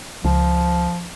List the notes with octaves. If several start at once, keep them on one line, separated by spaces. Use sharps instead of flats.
C#2 F3